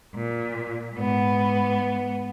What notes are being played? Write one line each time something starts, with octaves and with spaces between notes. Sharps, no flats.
A#2
G#2 B3